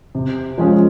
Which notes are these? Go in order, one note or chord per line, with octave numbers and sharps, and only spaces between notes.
C3
F3 G#3 C#4 G#4